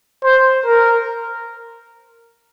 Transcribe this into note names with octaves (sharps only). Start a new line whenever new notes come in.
C5
A#4